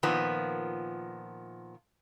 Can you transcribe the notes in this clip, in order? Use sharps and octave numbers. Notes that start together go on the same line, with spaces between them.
A#2 D#3 F3 B3